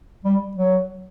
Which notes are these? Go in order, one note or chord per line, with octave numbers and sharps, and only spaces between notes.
G3
F#3